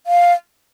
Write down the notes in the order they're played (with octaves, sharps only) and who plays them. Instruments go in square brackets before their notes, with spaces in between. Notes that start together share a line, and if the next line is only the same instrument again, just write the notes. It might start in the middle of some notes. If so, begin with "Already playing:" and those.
[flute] F5